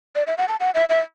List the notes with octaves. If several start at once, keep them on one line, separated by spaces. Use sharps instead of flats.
D5
E5
F#5
A5
F#5
E5
E5